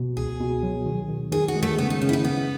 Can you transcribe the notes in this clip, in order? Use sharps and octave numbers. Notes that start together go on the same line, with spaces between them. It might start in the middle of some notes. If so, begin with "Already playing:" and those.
Already playing: B2
C#2 G#4
B2
F#3
D#3
D#3
D#3 G#4
F#4
G#3
A3
C#3 B3
D#4
C#3 C#4
E4
D#4
C#3 B3